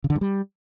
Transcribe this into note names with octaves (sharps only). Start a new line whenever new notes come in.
C#3
D3
G2
G3